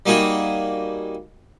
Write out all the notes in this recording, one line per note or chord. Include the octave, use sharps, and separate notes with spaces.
G3 A#3 D#4 F#4 G#4 G5